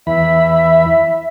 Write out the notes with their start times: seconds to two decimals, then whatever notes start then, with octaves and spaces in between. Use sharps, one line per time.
0.07 E2 E3 E5 B5